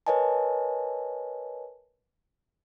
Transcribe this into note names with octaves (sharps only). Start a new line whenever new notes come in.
A#4 B4 C#5 D#5 G#5 A5